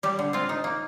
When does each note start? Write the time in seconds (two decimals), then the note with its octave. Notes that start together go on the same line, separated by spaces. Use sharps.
0.03 G3 G4
0.19 D3
0.33 C4 F4
0.49 D#4
0.64 A#3